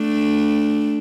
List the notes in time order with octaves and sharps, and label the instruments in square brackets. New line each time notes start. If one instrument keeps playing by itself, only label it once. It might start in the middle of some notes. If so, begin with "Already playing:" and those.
Already playing: [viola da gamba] A3 D4